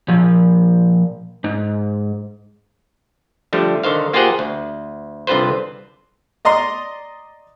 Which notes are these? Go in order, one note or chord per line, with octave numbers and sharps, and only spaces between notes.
A#2 F3
G#2
D3 F3 G3 A3
D3 D#3 C5 F5
A#3 F4 G4 G#4 C5 F#5
D2
C2 D3 C4 F4 B4 C5
D5 D#5 A#5 C6